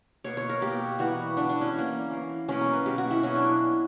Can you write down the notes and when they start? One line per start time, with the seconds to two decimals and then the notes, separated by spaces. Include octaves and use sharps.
0.24 B2 A#3 C#5
0.37 C#5
0.49 A#4
0.62 B2 A#3 G4
0.99 E3 G3 B3 F#4
1.37 E3 G3 B3 D4
1.49 D4
1.61 C#4
1.74 E3 A#3
2.11 E3 A#3
2.48 B2 F#3 A#3 C#4
2.61 A#4
2.73 B4
2.86 B2 F#3 A#3 G4
2.98 F#4
3.11 E4
3.23 B2 F#3 B3 C#4
3.36 D4